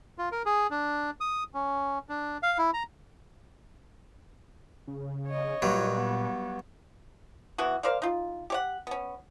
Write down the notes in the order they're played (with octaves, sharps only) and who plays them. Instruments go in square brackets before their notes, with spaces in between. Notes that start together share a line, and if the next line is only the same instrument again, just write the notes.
[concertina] F4
A#4
G#4
D4
D#6
C#4
D4
F5
E4
A#5
[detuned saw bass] C#3
[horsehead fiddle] C#5 D#5
[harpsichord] G2 F#3 [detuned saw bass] A#2
[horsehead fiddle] B3
[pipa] E3 B3 E4 F#4
A#4 C5 D5 F5
D#4 F4
G4 C#5 F#5
B3 C#4